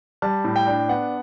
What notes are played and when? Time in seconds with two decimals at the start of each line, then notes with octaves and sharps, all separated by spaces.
0.22 G3 A5
0.44 A2
0.56 G5
0.67 D4
0.89 B3 F#5